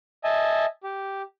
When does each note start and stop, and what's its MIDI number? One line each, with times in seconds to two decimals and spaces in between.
0.24 0.65 75
0.24 0.65 76
0.24 0.65 80
0.24 0.65 81
0.84 1.22 67